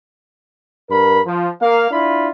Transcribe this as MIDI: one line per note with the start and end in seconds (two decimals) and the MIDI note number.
0.90 1.20 43
0.90 1.20 70
0.90 1.20 83
1.26 1.48 53
1.61 1.87 58
1.61 1.87 77
1.90 2.28 62
1.90 2.28 64
1.90 2.28 65
1.90 2.28 83